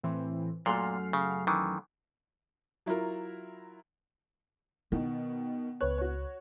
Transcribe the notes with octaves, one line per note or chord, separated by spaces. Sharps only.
A2 E3 C4
F#2 A#2 A3 F#5 C6 F6 C7
C#3
D#3 E3
F#3 E4 F4 A#4
B2 D#3 B3
C#2 B4 C#5 F#6
F#4 C#5